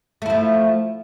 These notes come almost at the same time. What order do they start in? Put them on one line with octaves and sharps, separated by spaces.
A3 E4 F3